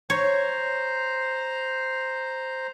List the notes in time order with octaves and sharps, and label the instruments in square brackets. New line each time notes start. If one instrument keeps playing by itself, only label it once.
[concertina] C5 A#5 [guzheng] C#5